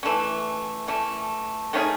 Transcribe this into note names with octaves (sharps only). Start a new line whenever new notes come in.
E3 A3 C#4
E3 A3 C#4
D#3 A3 C#4 G#4